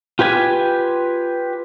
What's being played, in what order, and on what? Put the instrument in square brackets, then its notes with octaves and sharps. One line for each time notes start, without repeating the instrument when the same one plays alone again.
[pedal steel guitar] F4 G4 B4 G#5